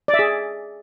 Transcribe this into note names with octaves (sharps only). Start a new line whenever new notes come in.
D5
E5
G#4